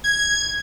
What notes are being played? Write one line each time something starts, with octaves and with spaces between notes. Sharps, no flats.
G#6